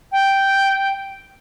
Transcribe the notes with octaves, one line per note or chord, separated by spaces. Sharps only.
G5